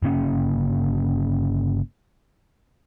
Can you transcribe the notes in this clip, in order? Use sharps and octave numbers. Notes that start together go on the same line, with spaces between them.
G1 C#3 A#3 C#4